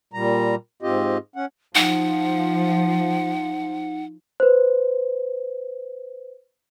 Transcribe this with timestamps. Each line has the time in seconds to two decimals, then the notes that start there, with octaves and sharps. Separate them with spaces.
0.13 A#2 G3 A#5
0.82 G#2 C4 F4 G4 D#5
1.36 C#4 F#5
1.75 F3 D#4 F#5
4.40 B4 C5